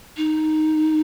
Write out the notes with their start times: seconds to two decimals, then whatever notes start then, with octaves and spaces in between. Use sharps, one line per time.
0.17 D#4